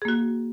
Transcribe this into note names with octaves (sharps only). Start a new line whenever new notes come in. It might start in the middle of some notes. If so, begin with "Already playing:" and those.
A#3 F#4 G#4